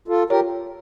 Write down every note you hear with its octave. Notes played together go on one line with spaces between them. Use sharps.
F4 A4
F4 G4 A#4 C#5